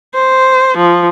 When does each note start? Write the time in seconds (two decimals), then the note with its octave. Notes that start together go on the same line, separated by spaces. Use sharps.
0.14 C5
0.77 F3